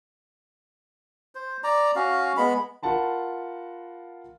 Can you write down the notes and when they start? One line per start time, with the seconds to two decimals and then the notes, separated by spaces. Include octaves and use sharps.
1.35 C5
1.64 D5 A#5
1.95 C#4 F#4 F5
2.37 G#3 B3 B5
2.83 F4 A#4 F#5 A5 B5